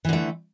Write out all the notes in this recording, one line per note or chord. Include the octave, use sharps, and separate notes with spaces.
D3 E3 A3